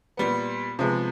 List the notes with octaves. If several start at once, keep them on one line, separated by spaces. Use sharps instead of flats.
A#2 G3 B3
C3 F3 G#3 B3